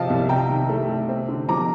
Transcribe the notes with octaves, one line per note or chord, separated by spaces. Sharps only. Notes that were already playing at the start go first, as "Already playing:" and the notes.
Already playing: C3 F3 D#5 F5 G5 A5
C2
C3 G5 A#5
D#3
A3
C3
C4
D3
F3 A#5 D6